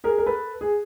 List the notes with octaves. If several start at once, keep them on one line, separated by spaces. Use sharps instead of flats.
G#4 A#4
A#4
A4 B4
G#4